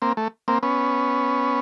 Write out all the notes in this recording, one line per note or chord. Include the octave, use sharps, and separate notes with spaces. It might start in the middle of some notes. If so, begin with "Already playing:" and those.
A#3 C4
A3
A#3 C4
B3 C#4